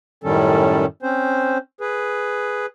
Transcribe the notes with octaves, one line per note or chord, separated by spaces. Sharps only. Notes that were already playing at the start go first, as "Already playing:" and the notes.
F#2 A2 D#3 G3 C#4 A4
C4 C#4 C5
G#4 B4